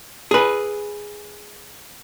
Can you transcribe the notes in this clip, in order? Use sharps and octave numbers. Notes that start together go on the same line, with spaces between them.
G#4 B4